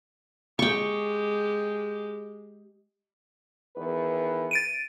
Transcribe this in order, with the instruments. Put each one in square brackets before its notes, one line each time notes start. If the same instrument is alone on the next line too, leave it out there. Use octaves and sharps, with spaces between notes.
[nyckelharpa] G#3 G4 [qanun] G5 C#6
[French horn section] E2 D#3 B4
[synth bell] A6 D7 D#7